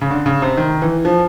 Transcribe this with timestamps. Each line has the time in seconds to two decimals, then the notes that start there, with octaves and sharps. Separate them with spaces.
0.01 C#3
0.11 D3
0.26 C#3
0.42 C3
0.57 D#3
0.82 E3
1.05 F3